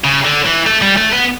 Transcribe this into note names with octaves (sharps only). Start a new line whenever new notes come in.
C#3
D3
E3
A3
G3
A3
B3